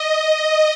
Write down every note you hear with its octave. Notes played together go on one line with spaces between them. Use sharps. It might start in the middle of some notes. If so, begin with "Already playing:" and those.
Already playing: D#5